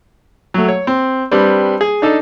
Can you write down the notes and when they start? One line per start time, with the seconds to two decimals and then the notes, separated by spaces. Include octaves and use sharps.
0.54 F#3 A3
0.68 C#5
0.87 C4
1.31 G3 C4 D4 B4
1.81 G#4
2.02 D4 D#4 A4 A5